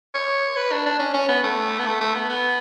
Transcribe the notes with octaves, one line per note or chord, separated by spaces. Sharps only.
C#5
B4
D4
D4
C#4
C#4
B3
A3
B3
A3
A3
B3
B3